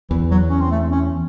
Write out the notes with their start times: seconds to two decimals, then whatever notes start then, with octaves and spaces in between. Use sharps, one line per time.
0.10 E2 E3
0.31 F#3
0.49 C#4
0.60 C4
0.71 A3
0.92 C#4